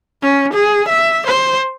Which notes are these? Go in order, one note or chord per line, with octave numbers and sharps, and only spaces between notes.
C#4
G#4
E5
C5